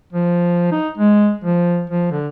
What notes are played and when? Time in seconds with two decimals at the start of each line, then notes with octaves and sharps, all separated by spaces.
0.13 F3
0.72 D#4
0.98 G#3
1.44 F3
1.90 F3
2.11 D3